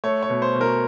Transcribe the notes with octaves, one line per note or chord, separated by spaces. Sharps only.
A3 C#5
C#5
B2
C5
B2
A#4